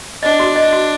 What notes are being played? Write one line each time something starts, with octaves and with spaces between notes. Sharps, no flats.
D4 D#5
F#4
D#5
F#4